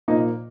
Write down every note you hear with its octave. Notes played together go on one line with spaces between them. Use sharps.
A#2 F3 A#3 D#4